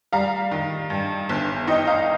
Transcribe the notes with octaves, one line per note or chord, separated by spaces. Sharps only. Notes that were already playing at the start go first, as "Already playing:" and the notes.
G3 F5 A#5
D#3
G2
G1
D#4 D#5 G5
F5 A#5